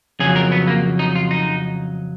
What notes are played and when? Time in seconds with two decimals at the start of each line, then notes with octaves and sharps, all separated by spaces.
0.20 F2 C#3 F#3 G#4
0.36 A#4
0.52 B3
0.67 A#3
0.99 D#4
1.15 F4
1.31 D#4